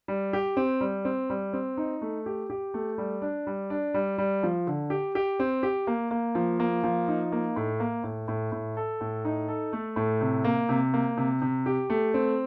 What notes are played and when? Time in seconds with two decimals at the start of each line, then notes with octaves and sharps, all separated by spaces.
0.08 G3
0.33 G4
0.57 C4
0.81 G3
1.05 C4
1.30 G3
1.53 C4
1.77 D#4
2.01 A3
2.26 G4
2.50 G4
2.74 A3
2.98 G3
3.22 D4
3.47 G3
3.70 D4
3.94 G3
4.18 G3
4.43 F3
4.67 D3
4.90 G4
5.15 G4
5.39 C4
5.63 G4
5.87 A#3
6.11 A#3
6.35 F3
6.60 A#3
6.84 F3
7.08 D#4
7.32 A#3
7.56 A2
7.80 A#3
8.03 A2
8.28 A2
8.52 A2
8.77 A4
9.01 A2
9.25 D#4
9.48 A4
9.73 A3
9.96 A2
10.21 C3
10.44 A#3
10.69 C3
10.94 A#3
11.17 C3
11.42 C3
11.66 G4
11.90 A3
12.14 C4